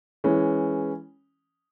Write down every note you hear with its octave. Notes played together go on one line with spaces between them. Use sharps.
E3 G#3 C#4